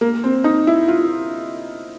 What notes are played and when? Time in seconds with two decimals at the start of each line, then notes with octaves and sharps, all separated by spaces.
0.01 A#3
0.24 C4
0.44 D#4
0.67 E4
0.88 F4